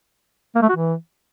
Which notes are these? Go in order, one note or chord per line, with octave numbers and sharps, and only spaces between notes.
A#3
A3
F#4
E3